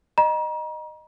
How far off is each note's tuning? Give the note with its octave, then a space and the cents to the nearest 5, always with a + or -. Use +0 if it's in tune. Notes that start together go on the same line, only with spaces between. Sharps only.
D#5 -15 A#5 +35